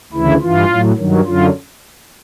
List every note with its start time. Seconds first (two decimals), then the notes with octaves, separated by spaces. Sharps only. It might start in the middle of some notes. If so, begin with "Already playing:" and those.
0.13 D2 C#3 E3 E4
0.41 G2 E3 F4
0.70 A2 F#3
0.98 G2 D#3 F#3
1.26 F#2 D3 F#3 F4